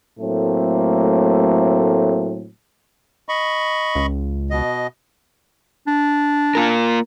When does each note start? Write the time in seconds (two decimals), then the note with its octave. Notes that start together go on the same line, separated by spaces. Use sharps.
0.19 A2 F#3 A3 A#3 C4
3.29 D#5 B5 C#6
3.95 C#2
4.51 B2 D#5
5.87 D4
6.55 A#3 F4 A#4